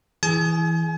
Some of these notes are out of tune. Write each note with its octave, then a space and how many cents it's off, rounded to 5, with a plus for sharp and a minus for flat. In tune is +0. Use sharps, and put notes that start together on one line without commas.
E3 +0 G#4 +0 G#5 +40